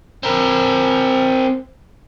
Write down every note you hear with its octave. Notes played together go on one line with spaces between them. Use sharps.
C4 A#4